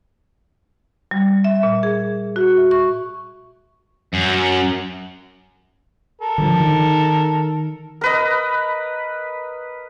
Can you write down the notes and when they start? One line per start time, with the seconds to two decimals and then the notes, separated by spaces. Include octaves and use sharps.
1.11 G3
1.44 E5
1.63 A#2
1.83 G#4
2.36 F#4
2.57 E5
2.71 C#6
4.13 F#2
6.21 A4 A#4
6.38 D3 E3 F3
6.60 D#3
8.01 A#4 B4 D#5